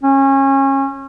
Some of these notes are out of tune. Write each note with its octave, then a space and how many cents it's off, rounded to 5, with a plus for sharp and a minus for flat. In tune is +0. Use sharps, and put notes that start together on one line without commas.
C#4 -30